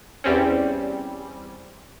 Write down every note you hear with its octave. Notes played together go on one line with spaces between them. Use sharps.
E2 G3 C4 C#4